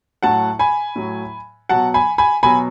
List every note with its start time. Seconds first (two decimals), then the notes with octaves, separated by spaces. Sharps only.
0.23 A2 F#3 F#5 A5
0.59 G#5 B5
0.96 A2 F#3
1.69 B2 F#3 F#5 A5
1.94 G#5 B5
2.18 G#5 B5
2.43 B2 F#3 G#5 B5